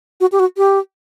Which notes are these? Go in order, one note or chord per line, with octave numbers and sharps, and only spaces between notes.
F#4
G4
F#4
G4